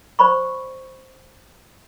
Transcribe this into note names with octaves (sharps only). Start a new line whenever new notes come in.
C5 D5 B5 C#6